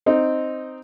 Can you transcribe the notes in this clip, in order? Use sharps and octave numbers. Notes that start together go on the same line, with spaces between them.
C4 D#4